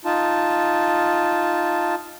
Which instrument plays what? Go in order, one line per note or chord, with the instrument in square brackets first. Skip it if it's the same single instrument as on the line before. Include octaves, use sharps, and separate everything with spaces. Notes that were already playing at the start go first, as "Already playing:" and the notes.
[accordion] D#4 F4 A5